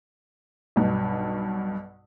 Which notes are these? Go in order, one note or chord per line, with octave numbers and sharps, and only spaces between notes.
B1 G2 B2